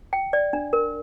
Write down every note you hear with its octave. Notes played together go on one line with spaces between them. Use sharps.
G5
D5
D4
A#4